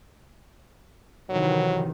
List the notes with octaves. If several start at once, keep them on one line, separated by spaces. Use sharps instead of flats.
C3 D#3 E3 F#3